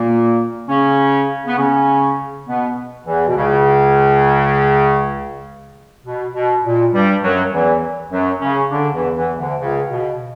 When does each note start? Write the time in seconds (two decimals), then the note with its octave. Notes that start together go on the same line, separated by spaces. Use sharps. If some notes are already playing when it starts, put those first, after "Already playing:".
Already playing: A#2 A#3
0.69 C#3 C#4
1.46 B3
1.57 C#3 C#4
2.47 B2 B3
3.06 E2 E3
3.27 B2
3.36 C#2 C#3
6.04 B2
6.34 B2
6.64 A#2
6.94 G2 G3
7.22 F#2 F#3
7.52 E2 E3
8.12 F#2 F#3
8.41 C#3 C#4
8.71 D3 D4
8.93 E2 E3
9.16 E2 E3
9.38 D2 D3
9.60 C#2 C#3
9.91 B2